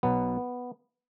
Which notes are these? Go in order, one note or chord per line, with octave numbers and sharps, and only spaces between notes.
B1 B2 F#3 B3